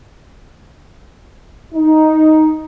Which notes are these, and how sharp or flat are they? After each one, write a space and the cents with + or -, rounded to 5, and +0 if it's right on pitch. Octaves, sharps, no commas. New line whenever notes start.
D#4 +5